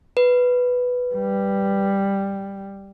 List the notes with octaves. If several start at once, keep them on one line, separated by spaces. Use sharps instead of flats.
B4
G3